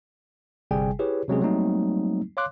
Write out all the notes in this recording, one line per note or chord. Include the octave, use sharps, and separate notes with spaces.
G1 C3 G3 G#4 G5 G#5
E4 G4 G#4 B4 C#5
C3 F#3 G#3 C4 C#4 G#4
F#3 G3 A3 A#3 C4 D#4
C#5 F5 C6 D6 F#6